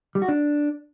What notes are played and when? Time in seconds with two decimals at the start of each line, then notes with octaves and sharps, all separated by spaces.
0.15 G3
0.22 F#4
0.28 D4